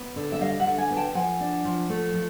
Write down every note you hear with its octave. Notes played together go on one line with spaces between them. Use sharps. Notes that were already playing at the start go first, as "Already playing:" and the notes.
Already playing: B3
D3
E5
G3 D#5 F5
E5 F#5
D3
F#5 G#5
B3
G5 A5
F3 F#5 G#5
D4
F3
A3
F3